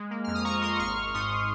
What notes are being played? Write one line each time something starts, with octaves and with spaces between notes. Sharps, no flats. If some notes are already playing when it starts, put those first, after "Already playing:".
Already playing: G#3
A#3
F2 F6
D#6
A#3 A#5 C#6
A#3 C6 D#6
G#1 C#6 F6
G#1
G#2 C6 D#6